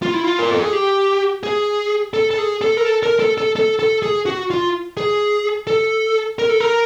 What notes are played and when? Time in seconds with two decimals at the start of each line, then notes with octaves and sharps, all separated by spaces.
0.02 F4
0.13 E4
0.24 F4
0.39 A#4
0.50 A4
0.62 G#4
0.73 G4
1.43 G#4
2.14 A4
2.31 A4
2.38 G#4
2.61 A4
2.77 A#4
2.85 A4
3.03 A#4
3.20 A4
3.38 A4
3.56 A4
3.79 A4
4.02 G#4
4.26 F#4
4.50 F4
4.97 G#4
5.67 A4
6.39 A#4
6.49 A4
6.60 A#4